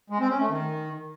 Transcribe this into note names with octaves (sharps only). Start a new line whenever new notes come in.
G#3
C4
C#4
A3
D#3